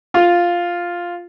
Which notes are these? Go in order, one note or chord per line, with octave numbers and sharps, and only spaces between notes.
F4